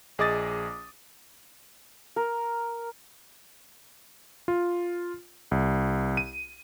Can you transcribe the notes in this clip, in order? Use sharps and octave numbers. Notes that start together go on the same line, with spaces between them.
A#1 G#4 D#5 D6 D#6 A6
A#4
F4
C2
D#7